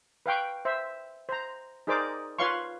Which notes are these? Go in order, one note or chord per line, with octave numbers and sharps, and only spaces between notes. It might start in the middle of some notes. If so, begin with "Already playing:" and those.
B4 F5 G5 C#6
C5 E5
C5 A#5
D#4 G#4 A#4 C5 D5 D6
F4 B4 C#5 F5 C6 C#6